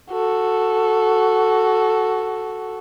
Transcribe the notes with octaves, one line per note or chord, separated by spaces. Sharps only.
F#4 A4